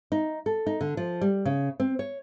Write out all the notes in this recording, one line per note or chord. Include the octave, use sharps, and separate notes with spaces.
D#4
A4
D#4
D3
F3
G3
C#3
C4
C#5